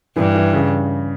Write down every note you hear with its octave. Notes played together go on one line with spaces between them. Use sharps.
G2 E3
E3
C#3